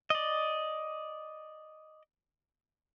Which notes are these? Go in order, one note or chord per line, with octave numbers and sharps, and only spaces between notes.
D5 D#5